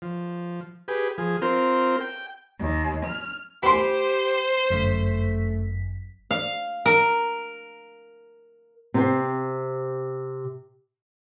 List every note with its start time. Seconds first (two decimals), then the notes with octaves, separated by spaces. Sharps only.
0.02 F3
0.88 G4 G#4 B4
1.18 F3 G#4
1.42 C4 F4 A#4 C5
2.01 G5
2.59 D#2
3.04 F6
3.63 G4 C5 B5 C6
4.70 G1 F#2 A3 B6
6.31 F5
6.86 A#4
8.94 C3 C4